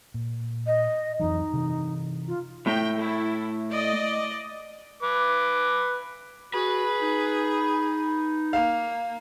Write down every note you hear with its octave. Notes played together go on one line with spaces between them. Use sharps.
A#2
D#5
F2 E3 F#3 D#4
C3 E3
F4
A2 G5
E4 A4
D5 D#5
B4 D6
F#4 G#4 B4
D#4
A#3 F5